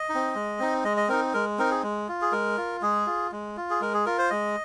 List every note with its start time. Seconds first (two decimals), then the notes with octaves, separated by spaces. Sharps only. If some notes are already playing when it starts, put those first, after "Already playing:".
Already playing: D#5
0.09 D#4
0.15 C4
0.35 G#3
0.60 C4 D#4
0.84 G#3 D#5
0.97 D#5
1.08 C4 D#4 A#4
1.34 G#3 A#4
1.58 C4 D#4 A#4
1.71 G#4
1.83 G#3
2.08 F4
2.21 G#4
2.32 G#3 A#4
2.57 F4
2.82 G#3 G#4
3.07 F4
3.32 G#3
3.57 F4
3.70 G#4
3.81 G#3 A#4
3.94 G#4
4.06 F4 A#4
4.18 C5
4.30 G#3 D#5